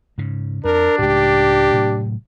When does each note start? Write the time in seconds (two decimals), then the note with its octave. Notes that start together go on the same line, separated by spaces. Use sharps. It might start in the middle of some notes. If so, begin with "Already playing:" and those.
0.18 G#2 C#3
0.65 F2 D4 A#4
0.99 C#2 A2 G4
1.74 A2 C3 F#3